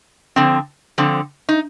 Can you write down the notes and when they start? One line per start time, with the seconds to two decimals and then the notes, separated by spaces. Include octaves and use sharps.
0.36 D3 F3 C4
0.98 D3 F3 C4
1.49 D#4